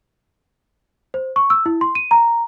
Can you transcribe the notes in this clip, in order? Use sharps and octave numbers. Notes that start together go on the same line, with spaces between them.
C5
C#6
E6
E4
C6
D#7
A#5